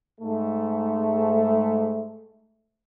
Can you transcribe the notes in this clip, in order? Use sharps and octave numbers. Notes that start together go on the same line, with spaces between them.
G#2 A3